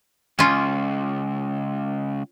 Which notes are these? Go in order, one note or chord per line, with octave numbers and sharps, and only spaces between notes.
C#2 C#4 F4